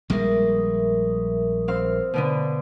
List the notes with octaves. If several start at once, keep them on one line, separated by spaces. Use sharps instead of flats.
A#1 G3 G#3 A#4 E5 D#6
C4 F5 C6
B2 D3 B3